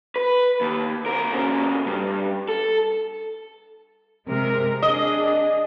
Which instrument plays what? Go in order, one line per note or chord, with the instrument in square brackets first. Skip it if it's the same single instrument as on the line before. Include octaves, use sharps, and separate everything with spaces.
[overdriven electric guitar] B4
D#2
C4 A#4
A#2 C#3
G2
A4
[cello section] C3 G#3 A#4
[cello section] D4 G#4 [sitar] D#5